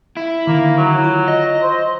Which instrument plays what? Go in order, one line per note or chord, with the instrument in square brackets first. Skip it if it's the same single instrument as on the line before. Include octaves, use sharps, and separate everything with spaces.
[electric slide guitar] E4
[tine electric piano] D3 D#3 [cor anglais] A#3
[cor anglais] F#3
[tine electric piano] F4
[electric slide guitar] D#5
[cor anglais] C5